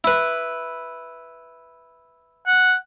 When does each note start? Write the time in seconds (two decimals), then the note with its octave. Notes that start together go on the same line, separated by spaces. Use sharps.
0.04 E4 B4
2.46 F#5